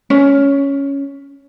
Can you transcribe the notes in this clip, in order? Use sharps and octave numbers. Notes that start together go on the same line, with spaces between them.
C#4